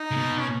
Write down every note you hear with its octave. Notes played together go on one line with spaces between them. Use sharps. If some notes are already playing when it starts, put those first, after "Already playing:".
Already playing: D#4
C#3
B2
C#4